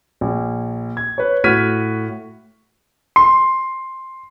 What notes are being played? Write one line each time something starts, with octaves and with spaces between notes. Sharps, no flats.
A#1
G#6
B4 C#5
A2 F#4 F6 G#6 B6 D#7
C6